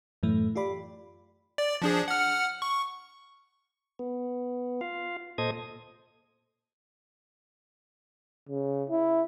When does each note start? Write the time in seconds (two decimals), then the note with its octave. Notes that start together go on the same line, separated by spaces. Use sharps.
0.23 F#2 A2 E3 A3
0.56 F4 G4 D5 B5
1.58 D5
1.82 F3 D4 G#4
2.08 F#5 F6
2.62 C#6
3.99 B3
4.81 F4 F5
5.38 A#2 A4 C5 D#5 D#6 G#6
8.49 C#3
8.90 E4